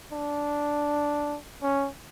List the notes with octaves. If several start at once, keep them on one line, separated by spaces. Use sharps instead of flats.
D4
C#4